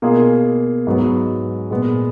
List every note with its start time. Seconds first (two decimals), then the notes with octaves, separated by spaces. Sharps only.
0.02 B2 A#3 F4 G#4
0.87 G#2 F#3 B3
1.70 A#2 G#3 B3